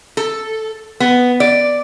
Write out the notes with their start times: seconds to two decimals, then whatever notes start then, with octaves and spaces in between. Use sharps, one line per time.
0.17 A4
1.00 B3
1.40 D5